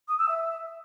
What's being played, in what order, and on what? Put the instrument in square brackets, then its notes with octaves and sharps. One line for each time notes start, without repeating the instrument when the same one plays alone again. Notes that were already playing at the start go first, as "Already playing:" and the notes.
[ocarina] D#6
E6
E5